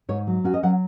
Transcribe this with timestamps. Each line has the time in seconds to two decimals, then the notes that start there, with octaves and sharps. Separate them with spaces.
0.09 G#2 C#5
0.27 F#3
0.44 C#4 F#4
0.54 D#5
0.63 F#3 F#5